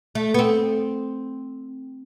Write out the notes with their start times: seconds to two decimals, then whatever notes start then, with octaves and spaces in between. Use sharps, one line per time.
0.15 A3
0.34 B3
0.39 C4